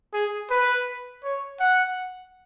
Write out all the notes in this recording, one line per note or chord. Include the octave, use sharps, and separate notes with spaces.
G#4
B4
C#5
F#5